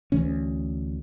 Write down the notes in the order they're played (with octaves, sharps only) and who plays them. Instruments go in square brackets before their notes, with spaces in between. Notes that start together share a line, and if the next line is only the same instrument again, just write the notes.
[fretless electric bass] D2 E3 A3 C#4